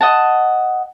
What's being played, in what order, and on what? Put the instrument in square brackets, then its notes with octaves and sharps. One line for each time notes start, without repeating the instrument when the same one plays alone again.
[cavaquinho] D#5 F#5 A5